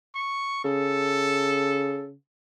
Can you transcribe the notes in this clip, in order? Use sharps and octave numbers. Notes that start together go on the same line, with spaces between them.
C#6
C#3 A4